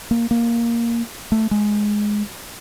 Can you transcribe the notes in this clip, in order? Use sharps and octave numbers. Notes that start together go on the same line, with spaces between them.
A#3
A#3
A3
G#3